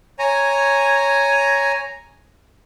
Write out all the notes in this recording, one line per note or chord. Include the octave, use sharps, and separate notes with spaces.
C#5 G#5 A#5